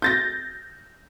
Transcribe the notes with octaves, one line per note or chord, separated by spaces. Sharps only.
G6 A6 A#6